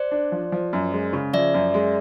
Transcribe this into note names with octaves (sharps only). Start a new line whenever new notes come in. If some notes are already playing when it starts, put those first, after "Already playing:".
Already playing: C5 D5
D4
F3
F3
F#2
G#3
C#3
F3 D5 E5
F#2
G#3